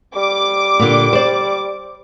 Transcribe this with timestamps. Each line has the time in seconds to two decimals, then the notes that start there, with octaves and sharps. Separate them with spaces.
0.16 G3 D6
0.79 A#2 D3
1.13 C5 D5